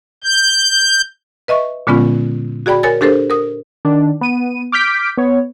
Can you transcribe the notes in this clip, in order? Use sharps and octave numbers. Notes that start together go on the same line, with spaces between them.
G6
B4 D#5 E5 C#6
A#2 D3 G#3 B3 C#4 F4
F#4 G#4 D5 G5 B5
A#4 C#5 G#5 A6
D4 G4 A4 A#4 C5
A#4 D#6
D#3 D4
B3 D#7
D6 F6 G6 B6 D7
B3 C#5